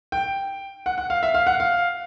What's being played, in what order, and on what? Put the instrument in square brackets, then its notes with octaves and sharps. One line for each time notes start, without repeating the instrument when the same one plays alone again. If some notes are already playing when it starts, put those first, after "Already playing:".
[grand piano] G5
F#5
F#5
F5
E5
F5
F#5
F5